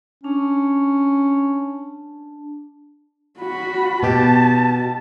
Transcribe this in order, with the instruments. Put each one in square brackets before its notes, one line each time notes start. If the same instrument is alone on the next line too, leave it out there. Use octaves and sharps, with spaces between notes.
[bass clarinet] C#4 [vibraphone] D4 A5
[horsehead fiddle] F#4 B5
[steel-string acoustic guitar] B2 G4 [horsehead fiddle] A5